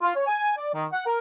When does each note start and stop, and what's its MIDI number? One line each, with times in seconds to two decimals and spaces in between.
0.02 0.12 65
0.15 0.23 73
0.27 0.54 80
0.56 0.69 74
0.74 0.85 51
0.92 1.04 78
1.06 1.19 70